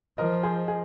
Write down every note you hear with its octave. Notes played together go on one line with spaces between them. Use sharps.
F3 A#4 D#5
G#4 C5
G#4